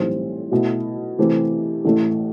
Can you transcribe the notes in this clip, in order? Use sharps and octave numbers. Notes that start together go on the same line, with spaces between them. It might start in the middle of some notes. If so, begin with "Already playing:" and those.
Already playing: B1 A2 E3 G3 C4
B2 A3 E4
C3 E3 A3 C4 G4
A1 A2 E3 A3